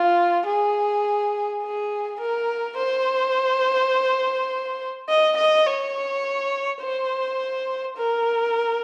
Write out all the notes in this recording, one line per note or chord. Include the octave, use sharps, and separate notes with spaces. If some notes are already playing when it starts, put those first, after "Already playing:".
Already playing: F4
G#4
G#4
A#4
C5
D#5
D#5
C#5
C5
A#4